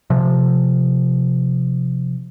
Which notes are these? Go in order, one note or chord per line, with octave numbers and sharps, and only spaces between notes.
C3 F3